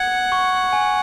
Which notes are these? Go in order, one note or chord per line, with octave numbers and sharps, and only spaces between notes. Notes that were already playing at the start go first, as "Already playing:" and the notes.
Already playing: F#5 G#6 C#7
C#6
G#5